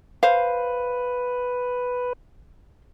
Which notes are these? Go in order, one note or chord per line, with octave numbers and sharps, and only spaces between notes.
B4 C5 F5